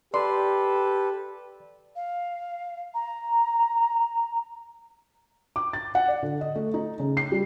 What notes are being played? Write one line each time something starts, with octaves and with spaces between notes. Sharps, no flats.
G4 A4 B4 D5 C6
F5
A#5
D6
A6
F#5
D5
D3
D#5
A3
D#4
C#3
C7
G3